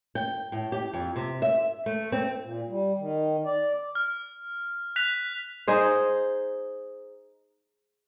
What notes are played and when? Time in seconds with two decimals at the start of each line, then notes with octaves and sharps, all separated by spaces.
0.15 G5
0.52 A2
0.72 G4
0.93 F2
1.16 C3
1.42 E5
1.86 A3
2.12 C4
2.43 A#2
2.68 G3
2.98 D#3
3.45 D5
3.95 F6
4.96 F#6 B6 F7
5.68 D#4 G#4 C5